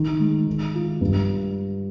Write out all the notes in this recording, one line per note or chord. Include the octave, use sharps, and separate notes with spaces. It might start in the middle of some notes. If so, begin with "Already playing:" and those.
Already playing: D#3
G#3
D#3
F4
G2